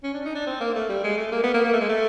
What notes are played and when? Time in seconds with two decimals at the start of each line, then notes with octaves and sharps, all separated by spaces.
0.04 C#4
0.14 D4
0.25 D#4
0.35 D4
0.47 C4
0.61 A#3
0.75 A3
0.89 G3
1.04 G#3
1.18 A3
1.32 A#3
1.43 B3
1.54 A#3
1.64 A#3
1.73 A3
1.80 G#3
1.89 A3